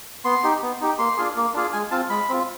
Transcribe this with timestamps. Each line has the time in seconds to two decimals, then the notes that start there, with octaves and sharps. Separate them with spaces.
0.25 B3 C6
0.44 D#4 G4
0.62 B3
0.81 D#4 G4
0.99 A#3 C6
1.17 D4 F4 G#4
1.36 A#3
1.54 D4 F4 G#4
1.73 G#3 G#5
1.91 C4 F4 A5
2.09 G#3 B5
2.29 C4 F4